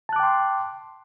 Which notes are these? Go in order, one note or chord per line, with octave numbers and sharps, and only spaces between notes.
G5 A5 C6 D6 F#6